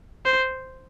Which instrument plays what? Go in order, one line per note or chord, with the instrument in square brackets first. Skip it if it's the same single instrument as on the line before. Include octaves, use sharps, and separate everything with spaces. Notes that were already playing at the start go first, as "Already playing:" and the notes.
[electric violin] C5